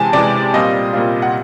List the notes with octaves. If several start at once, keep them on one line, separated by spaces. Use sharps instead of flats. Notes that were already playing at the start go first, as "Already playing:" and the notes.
Already playing: C3 E3 G#3 G#5 A5
C3 E3 G#3 D5
A#2 G3 C4 F4 D#5
A#2 G3 C4 F4
F#5